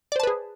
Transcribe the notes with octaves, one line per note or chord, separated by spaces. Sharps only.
G#4 B4 C5 D5 A5